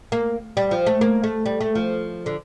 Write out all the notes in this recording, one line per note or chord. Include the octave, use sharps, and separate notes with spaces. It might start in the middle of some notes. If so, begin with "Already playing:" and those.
A#3
G3
F3
A3
A#3
A3
G3
A3
F3
D3